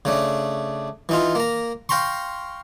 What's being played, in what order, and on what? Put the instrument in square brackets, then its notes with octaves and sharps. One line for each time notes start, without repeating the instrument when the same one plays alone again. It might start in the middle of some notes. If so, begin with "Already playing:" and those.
[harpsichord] C#3 A3 D4
E3 D#4 F4
A#3 A#5
F5 G5 A#5 C6 C#6